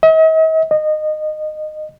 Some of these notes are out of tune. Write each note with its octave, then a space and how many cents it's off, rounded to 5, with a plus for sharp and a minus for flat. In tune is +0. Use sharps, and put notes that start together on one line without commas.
D#5 +45
D#5 -20